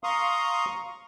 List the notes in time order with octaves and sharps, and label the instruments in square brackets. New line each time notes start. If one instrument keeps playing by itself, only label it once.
[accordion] F5 A#5 C6 C#6 D#6